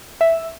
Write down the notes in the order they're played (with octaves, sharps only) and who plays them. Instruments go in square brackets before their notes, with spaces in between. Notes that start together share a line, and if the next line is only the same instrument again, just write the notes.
[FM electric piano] E5